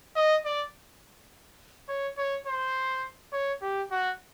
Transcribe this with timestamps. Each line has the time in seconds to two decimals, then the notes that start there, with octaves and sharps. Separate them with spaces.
0.16 D#5
0.45 D5
1.88 C#5
2.18 C#5
2.47 C5
3.33 C#5
3.62 G4
3.91 F#4